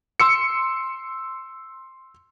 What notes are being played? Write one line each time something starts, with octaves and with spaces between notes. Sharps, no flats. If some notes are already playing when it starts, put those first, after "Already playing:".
C6 E6 C#7